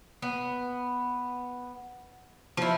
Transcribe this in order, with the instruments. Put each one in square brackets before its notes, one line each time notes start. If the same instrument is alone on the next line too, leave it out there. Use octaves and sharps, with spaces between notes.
[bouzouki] B3
F3 E4